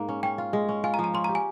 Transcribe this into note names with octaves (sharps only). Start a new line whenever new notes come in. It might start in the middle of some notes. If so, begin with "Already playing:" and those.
Already playing: G#2 A#3
C#4
C#4 G5
F4
G#3
C#4
F4 G#5
A#5
F3
A#5
C#4 C6
A#5
G4
G#5